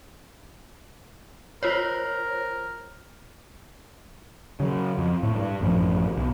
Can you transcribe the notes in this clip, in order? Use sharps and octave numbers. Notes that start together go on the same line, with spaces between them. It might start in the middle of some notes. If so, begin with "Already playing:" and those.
F4 A#4 C5 C#5
C#3 F#3
F2
A2
G2
A1 F#2 F3
B1